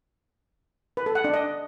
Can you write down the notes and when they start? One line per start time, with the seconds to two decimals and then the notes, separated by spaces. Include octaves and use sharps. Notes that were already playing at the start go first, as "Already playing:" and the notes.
0.97 B4
1.06 A4
1.15 F#5
1.24 D4
1.34 D#5